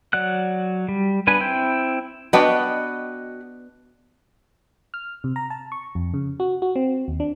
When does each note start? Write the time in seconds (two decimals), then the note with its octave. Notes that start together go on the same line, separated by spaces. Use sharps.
0.13 F#3 D5 F#5 F#6
0.89 G3
1.27 B3 D4 B4 G#5
1.40 C4 E4 G5 C6 G6
2.33 B3 D4 F#4 B4 D#5 G5
4.94 F6
5.24 C3
5.36 A#5
5.50 A5
5.72 C#6
5.95 F2
6.14 C#3
6.40 F#4
6.62 F#4
6.76 C4
7.08 D#2
7.20 D4